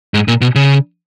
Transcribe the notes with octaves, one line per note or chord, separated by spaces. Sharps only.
G#2
A#2
B2
C#3